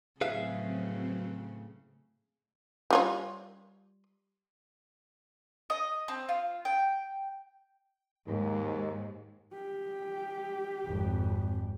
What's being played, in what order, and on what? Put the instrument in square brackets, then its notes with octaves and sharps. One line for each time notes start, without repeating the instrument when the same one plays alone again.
[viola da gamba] A2 C#3 [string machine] F#3 C4 [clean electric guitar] G#4 B4 F5 [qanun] E5
[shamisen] G3 F4 C#5
[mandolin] D#5
C4
F4
G5
[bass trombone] D#2 [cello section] G#2
[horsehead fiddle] G4
[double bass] G#1 F2